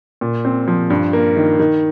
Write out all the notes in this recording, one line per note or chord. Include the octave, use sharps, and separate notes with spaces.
A#2
C4
F3
G2
A#3
D#3
D#3